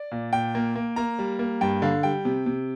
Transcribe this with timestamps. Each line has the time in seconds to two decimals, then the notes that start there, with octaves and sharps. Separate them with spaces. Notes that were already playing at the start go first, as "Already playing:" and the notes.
Already playing: D5
0.11 A#2
0.33 A#2 G5
0.55 A#3
0.75 A#3
0.96 A#3 A#5
1.19 G3
1.39 A#3
1.61 G2 G5
1.82 D3 F5
2.03 G3 G5
2.25 C3
2.46 C3